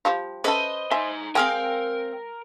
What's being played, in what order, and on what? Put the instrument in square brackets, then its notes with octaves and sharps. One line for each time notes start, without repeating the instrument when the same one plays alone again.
[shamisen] F3 G3 F4
[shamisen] C#4 A4 [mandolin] B4 C5 D#5
[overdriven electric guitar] D#4 C6 [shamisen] E5 G#5
[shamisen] G#3 G#4 [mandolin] C4 F5 G5 [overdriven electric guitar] A#4